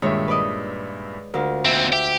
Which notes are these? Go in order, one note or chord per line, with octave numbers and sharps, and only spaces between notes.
G2 A#2 D#3 G#3 C#5 E5
B4 D5 D#5
D2 F4 A#4
D#2 C4 E5
G4 E5